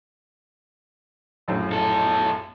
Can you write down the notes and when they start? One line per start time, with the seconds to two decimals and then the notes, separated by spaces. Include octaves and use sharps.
1.48 A#1 F#2 A2
1.71 B1 A4